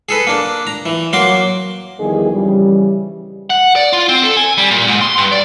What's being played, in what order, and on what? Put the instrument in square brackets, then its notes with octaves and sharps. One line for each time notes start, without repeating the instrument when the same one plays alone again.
[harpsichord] G#4 A4 B4
A#3 D4
A#5
E3
F#3 A#3 C6 D6
[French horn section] E2 D#3 F3 G3 G#4 D#5
F2 C#3 E3 G3
[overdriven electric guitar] F#5
D5
F4
C4
A4
G#5
G3
A#2
G#2
C6
G2
D5